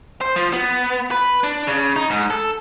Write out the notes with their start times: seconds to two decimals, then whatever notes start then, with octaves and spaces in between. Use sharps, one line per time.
0.21 C5
0.36 F3
0.53 B3
1.11 B4
1.44 D4
1.67 C#3
1.96 D#4
2.10 G#2
2.30 A4